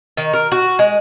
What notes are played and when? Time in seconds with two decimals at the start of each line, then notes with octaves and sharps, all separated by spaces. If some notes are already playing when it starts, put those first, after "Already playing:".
0.17 D#3
0.33 A#4
0.52 F#4
0.79 G#3